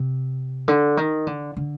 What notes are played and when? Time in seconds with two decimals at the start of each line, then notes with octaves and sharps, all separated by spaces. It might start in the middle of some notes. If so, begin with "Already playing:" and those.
Already playing: C3
0.68 D3
0.97 D#3
1.27 D3
1.57 D3